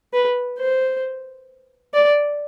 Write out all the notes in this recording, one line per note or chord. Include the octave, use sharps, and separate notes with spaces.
B4
C5
D5